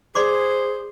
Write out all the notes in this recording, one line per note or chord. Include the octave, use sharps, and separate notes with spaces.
G#4 C5 D5 C6 D6